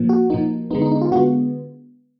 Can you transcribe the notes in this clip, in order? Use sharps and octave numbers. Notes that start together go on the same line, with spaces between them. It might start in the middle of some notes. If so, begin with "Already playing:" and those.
Already playing: A#2 F3 A#3
F#4
A#2 F3 A#3 D#4
D3 G#3 B3 D#4
D#4
D#4
F4
D3 G#3 B3 F#4